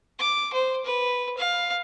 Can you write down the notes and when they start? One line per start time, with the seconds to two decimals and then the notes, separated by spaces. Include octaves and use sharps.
0.19 D6
0.53 C5
0.85 B4
1.38 F5